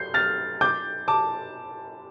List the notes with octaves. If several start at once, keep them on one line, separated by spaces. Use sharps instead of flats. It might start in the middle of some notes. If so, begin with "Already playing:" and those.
Already playing: G6 C7
F6 A6
D6 G6
A5 D6